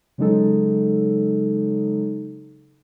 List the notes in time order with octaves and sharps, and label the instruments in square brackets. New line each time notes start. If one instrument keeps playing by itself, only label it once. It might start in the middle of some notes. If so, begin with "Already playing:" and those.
[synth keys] C#3 F#3 G#3 D#4 A4